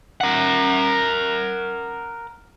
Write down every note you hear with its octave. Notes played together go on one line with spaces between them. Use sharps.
A#4 F#5